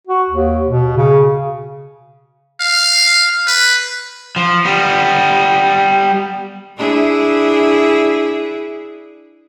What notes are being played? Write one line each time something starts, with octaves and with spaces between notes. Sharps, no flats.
F#4
D#2
B2
C#3
F5
B4
F3
G3 B3
D4 E4 G#4